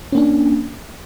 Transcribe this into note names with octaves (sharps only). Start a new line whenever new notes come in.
A#3 C#4 D4